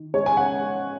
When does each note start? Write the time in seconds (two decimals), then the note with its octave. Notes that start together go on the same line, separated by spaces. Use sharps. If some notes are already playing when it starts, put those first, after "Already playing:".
Already playing: D#3
0.14 G#3 C#5
0.26 G#5
0.37 F#5